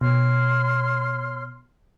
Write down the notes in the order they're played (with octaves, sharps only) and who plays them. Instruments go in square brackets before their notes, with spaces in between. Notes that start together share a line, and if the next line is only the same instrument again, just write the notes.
[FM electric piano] B2 [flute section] C#5 C6 F6